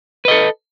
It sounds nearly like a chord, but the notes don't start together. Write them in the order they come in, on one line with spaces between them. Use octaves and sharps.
B4 D#5 A4